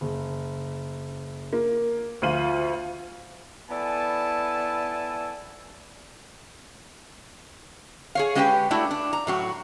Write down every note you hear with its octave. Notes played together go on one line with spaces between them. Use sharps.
F#1
A#3
D2 F3 F4 F5 D#7 F#7
B3 E4 A4 D5 G#5 A5
G#4 C#5 F5
G#3 C#4 G4 B4 E5 G5
A3 D4 E4 F#4
D4
A#5
A2 F#3 F#4